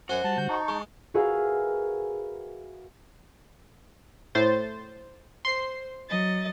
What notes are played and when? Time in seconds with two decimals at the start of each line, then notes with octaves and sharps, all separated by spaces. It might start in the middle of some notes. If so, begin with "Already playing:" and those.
0.09 F#2 F#4 C5 F#5 G#5
0.24 G3 A5
0.38 D3 G3 G6
0.49 D#4 A5 C#6
0.68 G#3
1.14 F#4 G#4 A#4 B4 E5 F5
4.35 A2 C5 A6
5.45 C5 C6 C7
6.09 F#3 D#5 A6